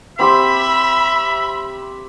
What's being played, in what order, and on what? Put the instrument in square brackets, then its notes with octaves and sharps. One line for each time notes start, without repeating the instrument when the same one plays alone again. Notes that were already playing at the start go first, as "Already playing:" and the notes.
[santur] C4 G4 C6 [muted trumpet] E5 [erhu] B5